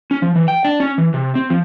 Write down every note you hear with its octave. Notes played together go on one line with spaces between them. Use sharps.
C#4
F3
E3
G5
D4
C#4
E3
C3
C4
F3